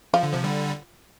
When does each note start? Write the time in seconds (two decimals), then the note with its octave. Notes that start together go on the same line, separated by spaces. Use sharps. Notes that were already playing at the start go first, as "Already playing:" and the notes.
0.14 F3 F4
0.23 D3
0.33 C3 F3
0.44 D3 G3